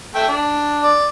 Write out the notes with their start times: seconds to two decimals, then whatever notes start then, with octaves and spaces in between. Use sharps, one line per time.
0.15 A3 E5 G5
0.29 D4
0.83 D5